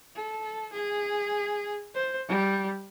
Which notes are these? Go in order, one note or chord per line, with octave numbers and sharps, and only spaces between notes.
A4
G#4
C5
G3